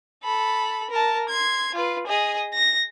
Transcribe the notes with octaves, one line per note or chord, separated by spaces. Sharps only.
A4 B5
A#4 A5
C6 G#6
F4 B4
G#4 D#5
A#6